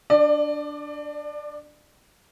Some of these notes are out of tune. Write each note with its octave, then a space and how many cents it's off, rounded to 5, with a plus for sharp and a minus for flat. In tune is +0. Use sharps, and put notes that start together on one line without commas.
D4 +0 D5 +30